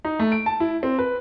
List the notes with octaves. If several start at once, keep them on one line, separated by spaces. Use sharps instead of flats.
D#4
A3
D7
A5
E4
C4
B4